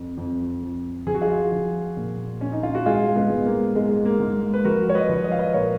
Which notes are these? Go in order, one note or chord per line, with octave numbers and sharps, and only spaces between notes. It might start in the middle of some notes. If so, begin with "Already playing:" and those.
Already playing: F2
F2
F2
F3 G#4
F#4
F4 G#4
F3
A#2
A#2 C#4
D#4
F4
F#4
G#2 F4 G#4
G#3 B3
G#2
A#3
G#2 G#3
A#3
G#2
B4
F3 F#4 A#4
C#5
B4 D#5
F3
D#5
F5
B4 D#5
A#2 A#4 C#5